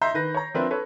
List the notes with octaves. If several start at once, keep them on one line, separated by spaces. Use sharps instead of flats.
D#5 E5 A#5 C6 G6 C7
D#3 B4 A#6
C#5 A#5
F3 C4 D4 A#4 B4 E5
A4 B4 C#5